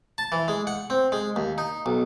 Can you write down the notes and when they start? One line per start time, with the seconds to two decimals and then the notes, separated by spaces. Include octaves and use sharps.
0.18 A5
0.32 E3
0.48 G#3
0.67 F#5
0.90 C4
1.12 G#3
1.36 D#2
1.58 D#4
1.86 B1